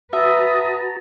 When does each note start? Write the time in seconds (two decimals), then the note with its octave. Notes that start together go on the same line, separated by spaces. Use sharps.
0.13 F#4 B4 E5 A5 A#5 D#6